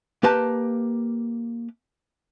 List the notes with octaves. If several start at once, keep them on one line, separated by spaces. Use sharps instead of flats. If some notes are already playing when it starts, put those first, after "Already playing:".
A#3 G4 B4 A5